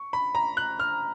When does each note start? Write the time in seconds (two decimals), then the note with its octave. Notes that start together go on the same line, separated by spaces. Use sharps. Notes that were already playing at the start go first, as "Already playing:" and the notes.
Already playing: C#6
0.13 B5
0.35 A#5
0.57 F#6
0.80 F6